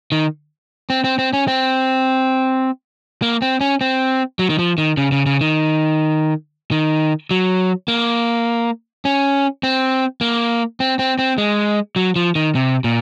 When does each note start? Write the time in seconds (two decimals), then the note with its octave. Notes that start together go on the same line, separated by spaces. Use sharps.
0.12 D#3
0.90 C4
1.04 C4
1.19 C4
1.33 C#4
1.48 C4
3.22 A#3
3.42 C4
3.61 C#4
3.81 C4
4.39 F#3
4.50 D#3
4.59 F3
4.78 D#3
4.97 C#3
5.12 C#3
5.26 C#3
5.41 D#3
6.71 D#3
7.31 F#3
7.88 A#3
9.05 C#4
9.63 C4
10.21 A#3
10.80 C4
10.99 C4
11.19 C4
11.38 G#3
11.96 F#3
12.16 F3
12.35 D#3
12.55 C3
12.84 A#2